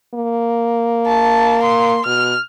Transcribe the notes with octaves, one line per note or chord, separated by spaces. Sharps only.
A#3
A5
C6
B2 F6